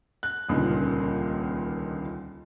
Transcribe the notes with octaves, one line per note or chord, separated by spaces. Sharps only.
F#6
D#1 C#2 A#2 D3 D#3